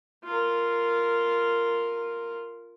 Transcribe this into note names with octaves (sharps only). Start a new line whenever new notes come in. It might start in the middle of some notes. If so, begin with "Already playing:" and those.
F4 A#4